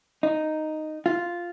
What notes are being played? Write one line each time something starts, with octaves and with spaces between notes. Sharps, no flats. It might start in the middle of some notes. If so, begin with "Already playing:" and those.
D#4
F4